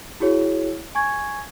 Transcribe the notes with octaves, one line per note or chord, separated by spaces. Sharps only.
E4 F#4 G#4 C#5
G#5 C#6 G#6